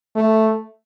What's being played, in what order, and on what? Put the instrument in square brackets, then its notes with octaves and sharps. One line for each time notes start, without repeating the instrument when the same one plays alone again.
[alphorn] A3